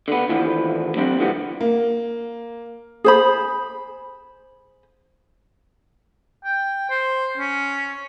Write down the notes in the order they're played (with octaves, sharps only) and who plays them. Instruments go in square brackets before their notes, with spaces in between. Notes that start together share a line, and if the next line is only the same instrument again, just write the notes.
[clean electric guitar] D3 B3
D#2 A2 D3 E3 F3
F#3 G3 C4 D4
C#2 D3 E3 F3 G3 B3
[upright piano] A#3
[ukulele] G#4 C5 B5
[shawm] G5
C5
C#4